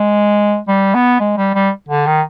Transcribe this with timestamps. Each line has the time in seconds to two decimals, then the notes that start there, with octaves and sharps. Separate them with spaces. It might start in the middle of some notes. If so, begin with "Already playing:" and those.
Already playing: G#3
0.68 G3
0.94 B3
1.20 G#3
1.37 G3
1.54 G3
1.89 D3
2.06 D#3